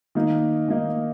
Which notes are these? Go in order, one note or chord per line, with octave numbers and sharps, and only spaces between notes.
D#3 A#3 D#4
D#3 A#3 D#4